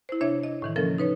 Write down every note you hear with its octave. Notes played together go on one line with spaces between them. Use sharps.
E4 C5
C3 D4 C#5 E5 G#6
D#5
A2 D#3 E3
C#3 F3 A#3 C#4 A4 A#4
D#4 B4 C#5